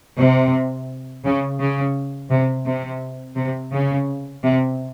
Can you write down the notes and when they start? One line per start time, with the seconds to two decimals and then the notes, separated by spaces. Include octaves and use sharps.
0.18 C3
1.24 C#3
1.60 C#3
2.30 C3
2.65 C3
3.37 C3
3.72 C#3
4.43 C3